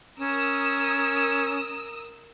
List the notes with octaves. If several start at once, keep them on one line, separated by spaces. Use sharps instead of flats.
C#4 A#4 D#6 E6